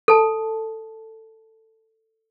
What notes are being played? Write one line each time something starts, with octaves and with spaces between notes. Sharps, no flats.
A4 A5